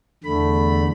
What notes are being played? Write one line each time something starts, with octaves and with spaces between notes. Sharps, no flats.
E2 D3 A3 B5